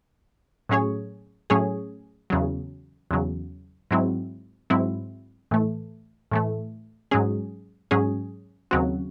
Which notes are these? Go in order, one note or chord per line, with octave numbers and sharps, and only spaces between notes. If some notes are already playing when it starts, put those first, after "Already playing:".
A2 F#3 C#4 G#4 C#5
A2 F#3 C#4 G#4 C#5
E2 C#3 F#3
E2 C#3 F#3
G#2 F#3 C4 E4
G#2 F#3 C4 E4
A2 E3 A3
A2 E3 A3
G#2 F#3 C#4 G#4
G#2 F#3 C#4 G#4
D#2 C#3 F#3 C4 F#4